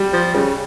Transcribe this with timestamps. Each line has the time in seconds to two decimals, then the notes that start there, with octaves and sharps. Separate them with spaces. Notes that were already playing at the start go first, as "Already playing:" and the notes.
Already playing: G3
0.13 F3
0.34 C#3 G3